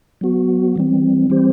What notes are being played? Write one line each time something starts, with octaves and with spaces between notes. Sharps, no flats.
F#3 B3 F#4
E3 G3 C4
E3 G3 C4 G4 C5